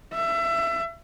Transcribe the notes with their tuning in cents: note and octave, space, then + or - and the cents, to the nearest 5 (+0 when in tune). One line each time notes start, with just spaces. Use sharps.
E5 +25